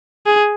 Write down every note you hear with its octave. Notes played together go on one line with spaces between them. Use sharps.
G#4